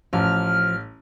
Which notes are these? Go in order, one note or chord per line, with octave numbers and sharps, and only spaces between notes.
A1 F3 F6